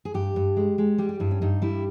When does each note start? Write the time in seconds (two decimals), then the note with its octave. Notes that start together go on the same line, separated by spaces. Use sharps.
0.05 G#4
0.14 G2 G4
0.36 G2
0.57 G#3
0.78 G#3
0.98 G3 G4
1.09 G4
1.20 G2 E4
1.31 C#4
1.41 G2 D#4
1.62 G3 E4